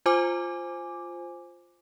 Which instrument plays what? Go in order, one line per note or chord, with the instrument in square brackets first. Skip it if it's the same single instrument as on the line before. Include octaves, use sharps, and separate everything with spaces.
[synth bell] F4 C5 G#5 D6